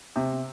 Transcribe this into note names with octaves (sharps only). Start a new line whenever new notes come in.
C3